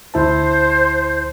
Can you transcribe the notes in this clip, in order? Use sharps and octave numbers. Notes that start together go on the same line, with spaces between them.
D2 E4 C5 A5